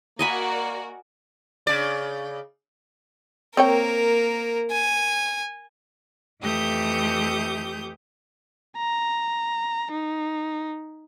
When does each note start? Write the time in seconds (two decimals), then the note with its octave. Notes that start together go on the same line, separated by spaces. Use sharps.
0.19 A#3 F#4 A#4 D5 D#5 G#5 B5
1.67 C#3 D5
3.57 A#3 C4 A#4 C#5 G5
4.71 G#5
6.40 F2 E3 A3 G4 D#6 G6
8.77 A#5
9.92 D#4